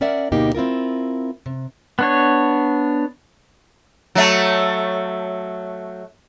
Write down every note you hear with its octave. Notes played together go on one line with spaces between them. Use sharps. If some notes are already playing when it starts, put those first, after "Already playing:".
C#4 A#4 D5 E5 F#5
D2 B2 A#3 D#4 G4
C4 E4 F4 A#4
C3
B3 D4 C#5
F#3 A3